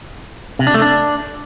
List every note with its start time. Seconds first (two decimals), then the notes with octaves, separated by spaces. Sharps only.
0.59 C3
0.67 D4
0.74 A3
0.82 D4